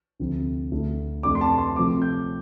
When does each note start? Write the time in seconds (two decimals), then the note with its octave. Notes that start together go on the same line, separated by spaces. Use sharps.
0.19 D2 C3 F3 C4
0.72 D2 D3 A3
1.23 F2 C3 A3 D4 D6
1.35 C6
1.41 A5
1.58 C6
1.76 C3 F3 A3 C4 D6
2.02 G6